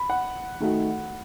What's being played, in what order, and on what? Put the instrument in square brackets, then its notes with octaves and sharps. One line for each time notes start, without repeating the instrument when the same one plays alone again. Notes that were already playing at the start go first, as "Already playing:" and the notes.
Already playing: [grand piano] B5
F#5
[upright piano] D#3 A3 D#4 F#4